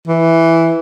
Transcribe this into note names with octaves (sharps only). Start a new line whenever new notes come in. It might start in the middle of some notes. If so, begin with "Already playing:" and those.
E3